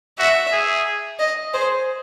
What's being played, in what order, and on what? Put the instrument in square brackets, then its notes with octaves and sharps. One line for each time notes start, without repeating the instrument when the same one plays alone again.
[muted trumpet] F#4 [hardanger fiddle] E5
[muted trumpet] G#4
[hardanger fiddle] D#5
[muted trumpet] G#4 [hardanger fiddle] C5